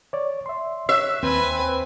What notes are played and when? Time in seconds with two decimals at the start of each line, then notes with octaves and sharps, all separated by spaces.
0.13 C#5 D5
0.46 E5 C6
0.89 C#5 E5 F#6
1.23 D#2 C4 B4 G#5